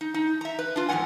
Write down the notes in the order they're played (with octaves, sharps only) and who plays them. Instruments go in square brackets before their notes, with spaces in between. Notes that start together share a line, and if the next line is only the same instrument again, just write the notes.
[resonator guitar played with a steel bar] D#4
D#4
E5 A#5
B4
D4 F4
F2 G#2 D3 G#3 F#5 G#5